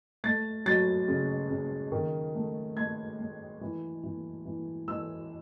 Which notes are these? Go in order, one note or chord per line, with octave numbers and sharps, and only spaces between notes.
A3 A6
F#3 A6
C#3
C#3
D#3
A3
A3 G#6
A3
E3
E3
E3
E3 E6